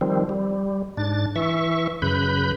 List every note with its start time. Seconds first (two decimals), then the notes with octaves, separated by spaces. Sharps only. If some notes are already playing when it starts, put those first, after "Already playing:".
0.01 D#3 F3 G3 C4
0.29 G3
0.97 G#2 D4 A6
1.36 E3 E5 C#6
2.02 F#2 C#3 B4 B5 G6